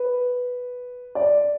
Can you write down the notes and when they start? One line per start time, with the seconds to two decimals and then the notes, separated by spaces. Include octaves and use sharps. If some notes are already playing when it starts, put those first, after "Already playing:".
Already playing: B4
1.15 D5